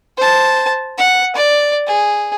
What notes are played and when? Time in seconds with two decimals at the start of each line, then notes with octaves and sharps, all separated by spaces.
0.18 C5 A5
0.98 F#5
1.35 D5
1.87 G#4